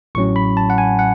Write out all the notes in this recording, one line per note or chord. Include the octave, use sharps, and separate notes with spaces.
A1 A2 F#3 C#4 C#6
B5
A5
F#5
G#5
F#5